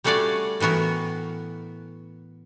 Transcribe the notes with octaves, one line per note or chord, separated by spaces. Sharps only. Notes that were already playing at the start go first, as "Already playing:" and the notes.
G3 A3 C#4 F#4 D5 F5
A2 E3 B3 F#4 A#4